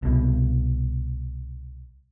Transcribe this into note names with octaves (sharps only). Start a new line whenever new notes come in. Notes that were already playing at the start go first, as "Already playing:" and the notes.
C2 B2